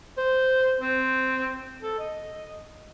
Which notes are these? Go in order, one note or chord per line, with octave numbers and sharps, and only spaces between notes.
C5
C4
A4
D#5